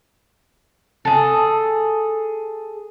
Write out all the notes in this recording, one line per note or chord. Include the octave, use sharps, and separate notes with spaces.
G#4 A4